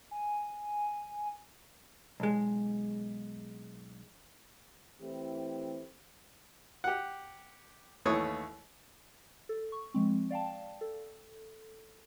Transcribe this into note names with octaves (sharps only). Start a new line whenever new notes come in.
G#5
B1 G#3
E3 A3 C4 E4 G4
G4 F#5
D#2 E3 A3 C#5 C#6 D#6
A4
C#6
F3 G#3 C4
D5 F5 G5 A5
A4